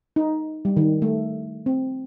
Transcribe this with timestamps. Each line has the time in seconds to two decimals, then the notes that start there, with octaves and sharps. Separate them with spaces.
0.16 D#4
0.65 G3
0.77 D#3
1.02 A3
1.66 C4